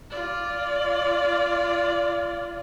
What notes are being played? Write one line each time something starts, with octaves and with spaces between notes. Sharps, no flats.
F4 D5